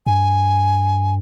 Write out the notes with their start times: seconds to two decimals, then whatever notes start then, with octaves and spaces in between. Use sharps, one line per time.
0.06 G2 G#5